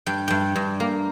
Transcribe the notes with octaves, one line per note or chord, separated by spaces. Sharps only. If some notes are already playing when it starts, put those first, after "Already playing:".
G2 G5
G2 G5
G2
A#3